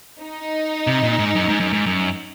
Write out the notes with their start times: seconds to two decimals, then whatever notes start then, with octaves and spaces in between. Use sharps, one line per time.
0.21 D#4
0.87 C3
1.03 A#2
1.19 G#2
1.35 F#2
1.49 G#2
1.60 F#2
1.73 G#2
1.86 F#2